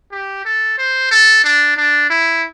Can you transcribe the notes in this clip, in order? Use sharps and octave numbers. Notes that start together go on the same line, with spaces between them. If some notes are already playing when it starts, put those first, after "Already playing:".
G4
A4
C5
A4
D4
D4
E4